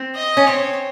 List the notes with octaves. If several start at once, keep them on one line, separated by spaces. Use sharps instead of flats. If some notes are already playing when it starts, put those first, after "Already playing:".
Already playing: C4
D#5
C#4
C4 C#5